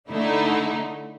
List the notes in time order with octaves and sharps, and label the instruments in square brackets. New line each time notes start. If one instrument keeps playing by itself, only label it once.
[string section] D3 A3 D#4 E4